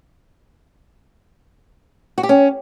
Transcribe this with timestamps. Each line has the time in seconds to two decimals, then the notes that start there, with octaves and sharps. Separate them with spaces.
2.18 F#4
2.23 G4
2.29 C#4